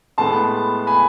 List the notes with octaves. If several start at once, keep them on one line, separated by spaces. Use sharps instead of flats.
A2 G#3 B3 A5 C6
G#5 B5